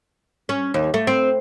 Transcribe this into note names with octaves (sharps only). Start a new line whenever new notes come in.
C#4
D#2
A3
C4